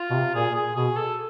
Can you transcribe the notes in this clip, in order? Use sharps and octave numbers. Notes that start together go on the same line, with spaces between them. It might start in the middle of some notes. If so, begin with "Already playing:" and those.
Already playing: F4
B2
C3
A#2 G#4
G#4
B2 G#4
A4